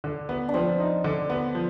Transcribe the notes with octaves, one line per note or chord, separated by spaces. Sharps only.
D3
B3
D4
F3 C4
D#4
D3
B3
F3